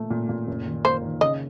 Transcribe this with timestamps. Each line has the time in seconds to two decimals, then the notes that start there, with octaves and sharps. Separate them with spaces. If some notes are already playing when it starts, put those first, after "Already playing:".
Already playing: A#2 A3
0.10 A#2
0.29 A#2
0.47 F#1
0.66 D#3
0.85 A#3 C5
1.03 D#3
1.21 C#3 D#5